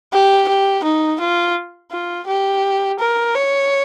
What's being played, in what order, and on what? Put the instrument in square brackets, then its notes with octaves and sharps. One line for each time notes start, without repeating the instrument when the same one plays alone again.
[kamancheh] G4
G4
D#4
F4
F4
G4
A#4
C#5